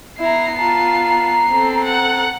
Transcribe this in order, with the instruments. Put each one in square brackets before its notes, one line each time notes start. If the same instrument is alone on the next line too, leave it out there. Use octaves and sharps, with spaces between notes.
[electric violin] B3 C7 [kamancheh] E4 A#5
[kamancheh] F4 A5 [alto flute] A#5
[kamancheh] C4 A4
[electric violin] F#5